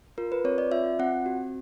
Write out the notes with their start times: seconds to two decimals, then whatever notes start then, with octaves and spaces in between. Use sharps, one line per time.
0.18 F4 A#4
0.32 B4
0.44 C4 C#5
0.58 D5
0.72 F4 E5
0.99 C4 F#5
1.26 F#4